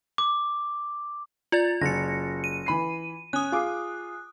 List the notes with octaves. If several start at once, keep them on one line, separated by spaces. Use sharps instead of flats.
D6
F4 D5 A6
F#1 A#6 C#7
D#7
E3 B5 C7
C#4 D#6 F#6
F4 G#4 D6